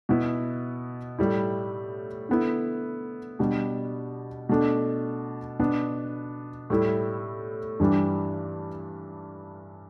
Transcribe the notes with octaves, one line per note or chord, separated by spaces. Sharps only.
B2 B3 E4
A2 G3 E4
D3 B3 E4
B2 G3 D4
B2 A3 D4
B2 B3 D4
A2 G3 E4
G2 E3 G3 D4